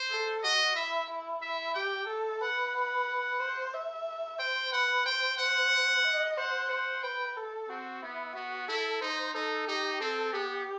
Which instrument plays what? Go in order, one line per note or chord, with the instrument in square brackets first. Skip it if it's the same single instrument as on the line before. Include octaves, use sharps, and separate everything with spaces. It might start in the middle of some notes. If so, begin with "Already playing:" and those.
Already playing: [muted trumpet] C5
[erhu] A4
[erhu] F#4 [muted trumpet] D#5
[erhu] E4 [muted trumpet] E5
[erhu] E4
[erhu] E4 [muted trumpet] E5
[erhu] G4 [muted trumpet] G5
[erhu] A4
[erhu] B4 [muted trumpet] F#5
[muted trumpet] F#5
[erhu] C5
E5
[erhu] C5 [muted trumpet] G5
[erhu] B4 [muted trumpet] F#5
[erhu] C5 [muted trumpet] G5
[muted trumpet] F#5
[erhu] D#5
[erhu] C5 [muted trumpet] F#5
[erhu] C5 [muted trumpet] F#5
[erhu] B4 [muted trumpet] G5
[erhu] A4
[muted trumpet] C4 [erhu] F#4
[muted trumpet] B3 [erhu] E4
[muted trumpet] B3 [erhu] F#4
[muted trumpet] E4 [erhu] A4
[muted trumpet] D#4 [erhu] C5
[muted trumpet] D#4 [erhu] A4
[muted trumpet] D#4 [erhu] G4
[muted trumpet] C4 [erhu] A4
[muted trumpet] B3 [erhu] G4